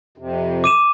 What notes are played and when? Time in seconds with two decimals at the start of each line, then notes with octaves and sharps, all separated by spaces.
0.18 F2 C3
0.64 D6 D#7 E7